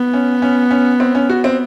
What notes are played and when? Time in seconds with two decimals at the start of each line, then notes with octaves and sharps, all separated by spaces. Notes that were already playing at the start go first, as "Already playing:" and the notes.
Already playing: B3
0.13 C#4
0.42 C#4
0.71 C#4
1.00 C4
1.15 C#4
1.29 F#4
1.44 C4